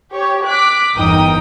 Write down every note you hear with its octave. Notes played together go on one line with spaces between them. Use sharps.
G4 C#5
D6 F#6 B6
G1 E2 D#4 A#4 G5 D#6